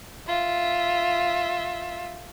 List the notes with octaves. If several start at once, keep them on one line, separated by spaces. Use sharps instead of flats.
F4 E5